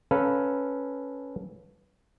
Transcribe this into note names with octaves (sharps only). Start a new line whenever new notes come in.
C#4 A4 B4 F5 A#5